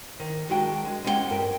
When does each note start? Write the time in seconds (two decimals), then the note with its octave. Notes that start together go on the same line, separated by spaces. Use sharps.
0.20 D#3
0.48 D#3 F#3 G#3 D4 F#4 G5
0.85 G#3
1.04 G#3 A#3 C#4 E4 F#5 G5
1.30 G2 A#4 G5